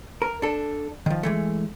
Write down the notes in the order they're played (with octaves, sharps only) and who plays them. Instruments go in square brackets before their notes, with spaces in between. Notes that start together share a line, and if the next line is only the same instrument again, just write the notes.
[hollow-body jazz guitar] A#4
D4 A4
D#3 F3
E3 G#3 A3